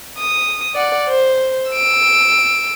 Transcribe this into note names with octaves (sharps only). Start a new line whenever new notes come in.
D#6
D5 F#5
C5
E6 D7